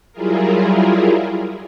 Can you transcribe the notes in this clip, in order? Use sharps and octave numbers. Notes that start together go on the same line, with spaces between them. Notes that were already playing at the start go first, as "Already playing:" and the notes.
F#3 G3 E4 F4 G#4 A#4